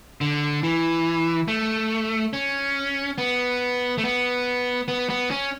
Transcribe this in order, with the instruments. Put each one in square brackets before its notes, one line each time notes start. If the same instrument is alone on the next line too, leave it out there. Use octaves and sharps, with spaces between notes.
[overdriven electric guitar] D3
E3
A3
C#4
B3
A3
B3
B3
B3
C#4